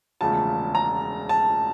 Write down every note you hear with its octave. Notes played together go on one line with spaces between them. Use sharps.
E1 D2 C#3 F3 A5
A#5
A5